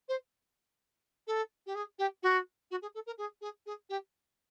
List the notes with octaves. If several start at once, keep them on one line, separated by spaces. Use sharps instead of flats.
C5
A4
G4
G#4
G4
F#4
F#4
G#4
A4
A#4
G#4
G#4
G#4
G4